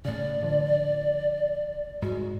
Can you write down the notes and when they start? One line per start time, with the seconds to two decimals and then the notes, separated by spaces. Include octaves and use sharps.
0.05 A2 C#3 D5
0.43 D3 F3
2.02 G#2 F#4